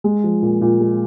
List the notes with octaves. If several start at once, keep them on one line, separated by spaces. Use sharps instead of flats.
G#3
F3
A#2
A#2
G#3